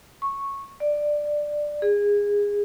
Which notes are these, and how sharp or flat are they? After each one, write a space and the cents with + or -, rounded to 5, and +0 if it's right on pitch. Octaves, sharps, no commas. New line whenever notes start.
C#6 -10
D5 +10
G#4 -20